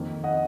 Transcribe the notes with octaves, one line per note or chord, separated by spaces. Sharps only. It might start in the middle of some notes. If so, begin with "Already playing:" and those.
Already playing: F2 D#3 A#3
D#5 F#5